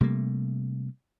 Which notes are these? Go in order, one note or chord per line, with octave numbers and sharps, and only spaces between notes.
C3 G3 A3 A#3